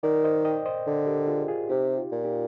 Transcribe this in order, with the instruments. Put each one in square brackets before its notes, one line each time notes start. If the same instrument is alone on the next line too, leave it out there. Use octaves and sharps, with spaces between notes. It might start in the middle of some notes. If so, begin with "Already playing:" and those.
[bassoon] D#3 [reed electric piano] A#4 D5
[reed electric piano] C5 D#5
D#5 G5
C5 D#5
[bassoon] D3
[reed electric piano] G4 A#4
F4 G#4
F4 G#4
[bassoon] C3 [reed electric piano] D#4 G4
[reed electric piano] F4
[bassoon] A#2
[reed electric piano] D#4 G4